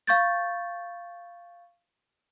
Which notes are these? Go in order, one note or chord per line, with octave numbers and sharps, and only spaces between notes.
F5 C#6 G6 A6